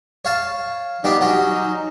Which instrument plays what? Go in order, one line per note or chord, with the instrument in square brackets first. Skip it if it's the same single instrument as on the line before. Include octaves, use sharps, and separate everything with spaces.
[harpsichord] C#5 F5 A5
[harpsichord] G3 B3 D4 [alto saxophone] D#4
[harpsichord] F#3 C#4